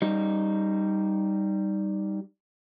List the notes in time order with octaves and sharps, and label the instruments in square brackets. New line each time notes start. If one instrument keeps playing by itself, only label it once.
[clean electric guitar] G3 D#4